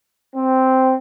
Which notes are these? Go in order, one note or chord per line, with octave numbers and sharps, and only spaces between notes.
C4